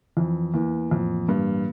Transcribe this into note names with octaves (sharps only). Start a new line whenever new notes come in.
F2 E3
E2 A#3
F2 A2
G2 A#3